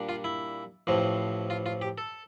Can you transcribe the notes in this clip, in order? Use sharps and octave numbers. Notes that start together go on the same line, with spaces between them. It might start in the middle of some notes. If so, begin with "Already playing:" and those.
Already playing: A#2 G3 D4
F4
E4
A1 A2 F3 C4
F4
F4
G4
A4